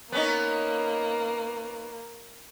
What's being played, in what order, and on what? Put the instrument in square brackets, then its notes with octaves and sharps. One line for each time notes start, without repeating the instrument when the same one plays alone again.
[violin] A#3 [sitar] B3 C#4 D#4